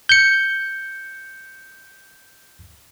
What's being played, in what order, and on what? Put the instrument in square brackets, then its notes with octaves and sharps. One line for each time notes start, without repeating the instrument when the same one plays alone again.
[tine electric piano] G6 C#7